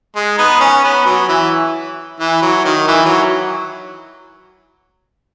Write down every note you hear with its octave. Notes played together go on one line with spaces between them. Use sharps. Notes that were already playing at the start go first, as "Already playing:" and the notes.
G#3
B3 D#4
C#4
B3
F#3
E3
E3
F#3
D#3
E3
F#3